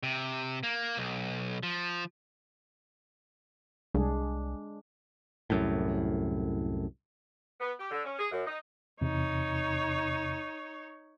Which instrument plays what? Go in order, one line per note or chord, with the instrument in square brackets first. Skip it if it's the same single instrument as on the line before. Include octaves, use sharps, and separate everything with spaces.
[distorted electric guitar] C3
A#3
B1
F3
[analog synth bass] C2 [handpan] G#3 D4 G#4
[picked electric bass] C2 F#2 A2
[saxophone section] B3
G4
D3
C#4
G#4
F#2
D#4
[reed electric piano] E2 C3 [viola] D#4 C#5